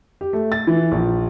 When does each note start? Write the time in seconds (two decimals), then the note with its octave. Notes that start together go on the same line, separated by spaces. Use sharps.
0.21 G4
0.33 A3
0.52 A6
0.67 E3
0.91 A#1